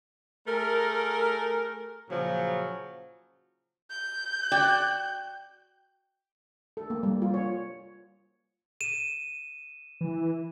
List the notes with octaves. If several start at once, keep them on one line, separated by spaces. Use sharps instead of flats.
A3 G#4 A#4
A#2 C#3 F3 F#3
G6
F#4 D5 G5
A4
A#3
G3
F4
C#5
D#7 E7
E3